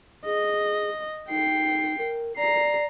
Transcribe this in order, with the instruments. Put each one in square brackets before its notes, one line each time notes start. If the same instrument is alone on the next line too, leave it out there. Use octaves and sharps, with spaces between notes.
[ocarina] G#4 [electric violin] D#5
[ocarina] D#4 [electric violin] G5 C7
[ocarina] A#4
[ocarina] D5 [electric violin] A#5 C7